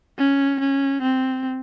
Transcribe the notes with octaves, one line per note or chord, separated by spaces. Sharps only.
C#4
C#4
C4